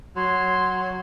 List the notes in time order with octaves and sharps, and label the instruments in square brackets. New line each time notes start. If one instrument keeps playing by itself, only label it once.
[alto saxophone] F#3 [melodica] C#5 [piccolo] C6